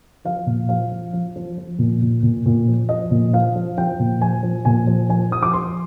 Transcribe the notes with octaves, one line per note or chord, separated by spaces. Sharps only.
F3 F5
A#2
F3 F5
F3
F3
F3
F3
A#2
A#2
A#2
A#2
F3
F3 D#5
A#2
F3 F5
F3
F3 G5
A#2
F3 G#5
F3
A#2 G#5
F3
F3 G#5
F3 D#6
D6
F3 C6